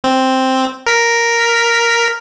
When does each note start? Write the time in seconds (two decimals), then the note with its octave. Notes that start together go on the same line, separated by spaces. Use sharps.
0.04 C4
0.86 A#4 B6